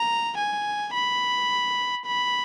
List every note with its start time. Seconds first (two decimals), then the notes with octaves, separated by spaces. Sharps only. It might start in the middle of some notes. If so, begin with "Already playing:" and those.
Already playing: A#5
0.38 G#5
0.94 B5
2.06 B5